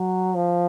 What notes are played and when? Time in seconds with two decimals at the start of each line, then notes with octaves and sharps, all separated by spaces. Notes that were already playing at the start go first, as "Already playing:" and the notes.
Already playing: F#3
0.35 F3